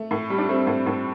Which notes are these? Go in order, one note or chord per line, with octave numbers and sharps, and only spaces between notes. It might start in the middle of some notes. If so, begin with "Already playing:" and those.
Already playing: A3
A2
G3
D4
G3 A3 C4
A2
A2